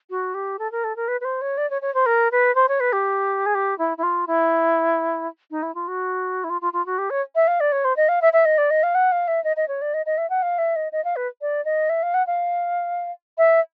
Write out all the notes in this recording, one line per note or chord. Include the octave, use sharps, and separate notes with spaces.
F#4
G4
A4
A#4
A4
A#4
B4
B4
C5
C#5
D5
C#5
C#5
C5
A#4
B4
C5
C#5
B4
G4
G#4
G4
E4
E4
F4
E4
D#4
E4
F4
F#4
E4
F4
F4
F4
F#4
G4
C#5
E5
F5
D5
C#5
C5
D#5
F5
E5
E5
D#5
D5
D#5
F5
F#5
F5
E5
D#5
D#5
C#5
D5
D#5
D#5
E5
F#5
F5
E5
D#5
D#5
F5
B4
D5
D#5
E5
F5
F#5
F5
E5